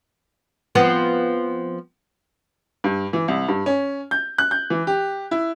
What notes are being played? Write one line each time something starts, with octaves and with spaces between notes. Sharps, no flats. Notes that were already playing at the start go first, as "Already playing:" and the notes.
F3 B3 C4
G2
E3
C2
G2
C#4
G6
F#6
G6
E3
G4
E4